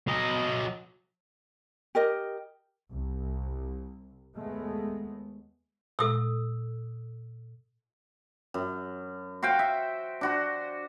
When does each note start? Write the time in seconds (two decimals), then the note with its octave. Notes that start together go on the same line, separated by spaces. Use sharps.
0.08 F#3 D#5
1.95 G4 A#4 D#5
2.90 C2
4.37 D#2 G#3 A3 B3
5.99 A#2 A4 D#6 E6
8.54 F#2
9.43 F#4 C5 F5 G5
9.59 E5
10.21 D4 F#4 C5